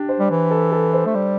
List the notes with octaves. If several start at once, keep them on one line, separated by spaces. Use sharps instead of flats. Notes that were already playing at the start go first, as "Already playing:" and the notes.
Already playing: D4 G4
C5
G3
E3
A4
A4
C5
A3
G3